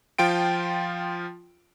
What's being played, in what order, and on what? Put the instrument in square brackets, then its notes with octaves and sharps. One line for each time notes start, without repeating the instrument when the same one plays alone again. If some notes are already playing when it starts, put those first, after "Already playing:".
[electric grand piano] F3 F4 G5 D7